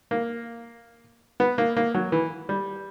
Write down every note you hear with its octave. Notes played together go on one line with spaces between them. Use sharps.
A#3
B3
A#3
A#3
F#3
E3
G3